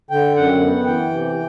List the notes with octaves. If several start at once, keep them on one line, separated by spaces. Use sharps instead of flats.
D3 G5
F#2 F#5
B3
E3 G5
C3